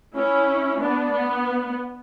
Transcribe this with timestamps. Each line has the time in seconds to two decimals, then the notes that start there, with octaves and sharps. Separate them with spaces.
0.16 C#4 E4
0.81 B3 D4
1.13 B3